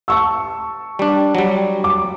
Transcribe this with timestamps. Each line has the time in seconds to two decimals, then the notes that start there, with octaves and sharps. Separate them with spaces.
0.08 A5 C#6 E6
0.99 G3 D4
1.35 F#3 G3
1.84 D6